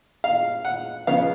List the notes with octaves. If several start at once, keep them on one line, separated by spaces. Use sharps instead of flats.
F5
F#5
C#3 F3 B3 F5